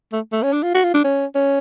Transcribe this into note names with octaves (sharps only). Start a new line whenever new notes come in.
A3
A3
C#4
D4
F4
F#4
F4
D4
C#4
C#4